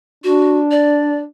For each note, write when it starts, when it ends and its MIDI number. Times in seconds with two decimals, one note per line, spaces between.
0.24 1.25 62
0.24 0.58 66
0.71 1.18 74